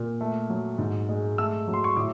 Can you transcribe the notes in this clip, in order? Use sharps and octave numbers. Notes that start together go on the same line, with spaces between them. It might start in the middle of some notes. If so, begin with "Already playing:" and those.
Already playing: A#2
A3
F#3
G#2
G#3
A3 E6
F#3
C6
C#6
A2 D6